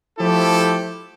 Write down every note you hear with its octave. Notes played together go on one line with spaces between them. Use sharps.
F3 A3 E4 G4 A4